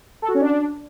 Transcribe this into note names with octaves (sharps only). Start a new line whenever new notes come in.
A4
F#4
C#4
D4